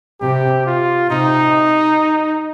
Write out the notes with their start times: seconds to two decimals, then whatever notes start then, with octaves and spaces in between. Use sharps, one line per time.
0.21 C3 G4
0.66 F4
1.09 C3 D#4